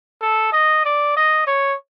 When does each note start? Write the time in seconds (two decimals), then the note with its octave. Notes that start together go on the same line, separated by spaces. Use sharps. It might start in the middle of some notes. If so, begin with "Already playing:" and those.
0.21 A4
0.53 D#5
0.85 D5
1.16 D#5
1.47 C#5